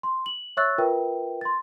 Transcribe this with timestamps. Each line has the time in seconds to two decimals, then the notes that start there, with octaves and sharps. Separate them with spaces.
0.03 C6
0.26 F#7
0.57 C#5 E5 C#6 E6 F#6 A6
0.78 F4 A#4 B4 E5 G5
1.41 C6 A6